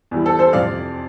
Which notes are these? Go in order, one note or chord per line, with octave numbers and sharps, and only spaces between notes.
E2 E3 G3
A4
A4 C5
F2 C3 F3 D5 F5